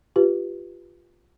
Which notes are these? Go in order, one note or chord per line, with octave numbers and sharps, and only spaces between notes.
F4 G4 B4